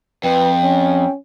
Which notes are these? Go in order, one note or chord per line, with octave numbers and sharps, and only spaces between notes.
F2 B4 G5
C#4